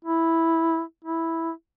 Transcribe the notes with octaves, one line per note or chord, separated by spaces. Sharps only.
E4
E4